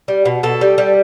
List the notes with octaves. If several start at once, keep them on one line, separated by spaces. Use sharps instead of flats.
G3
B2
B2 A4
G3
G3